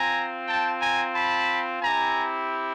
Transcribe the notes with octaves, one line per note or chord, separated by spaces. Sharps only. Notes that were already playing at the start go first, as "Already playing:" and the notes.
Already playing: C4 F4 G#5 A#5
G5 A5
G#5 A#5
A5 B5
C4 E4 G4 G#5 A#5